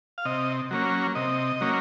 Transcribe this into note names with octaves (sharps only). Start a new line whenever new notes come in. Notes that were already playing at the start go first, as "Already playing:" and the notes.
F5
C3 D#5
F#3 A#3 C#4
C3 D#5
F#3 A#3 C#4